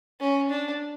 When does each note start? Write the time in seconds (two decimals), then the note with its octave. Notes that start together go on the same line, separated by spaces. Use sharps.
0.20 C#4
0.50 D4